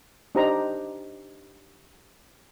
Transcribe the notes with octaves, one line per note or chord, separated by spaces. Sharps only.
D4 D#4 G4 C5 D#5 A#5